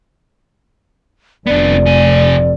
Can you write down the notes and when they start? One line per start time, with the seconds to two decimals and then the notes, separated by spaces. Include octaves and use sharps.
1.47 F1 B3 D4 D5
1.86 C3 G#5